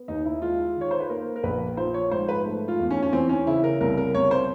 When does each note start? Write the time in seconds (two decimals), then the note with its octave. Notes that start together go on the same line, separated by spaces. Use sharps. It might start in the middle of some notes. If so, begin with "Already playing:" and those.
Already playing: B3
0.08 D#2 D#4
0.25 E4
0.42 G#3 F4
0.76 D#3
0.81 C#5
0.91 C5
1.00 B4
1.10 A#3 A#4
1.36 A#4
1.43 A#1 B4
1.77 F3 C5
1.94 C#5
2.11 G#2 C5
2.29 B4
2.45 A3
2.68 F4
2.79 E2
2.91 C#4
3.03 C#4
3.13 E3 C4
3.29 C#4
3.46 C#3 E4
3.64 A#4
3.80 C2 A#4
3.97 A#4
4.15 C2 C#5
4.31 C5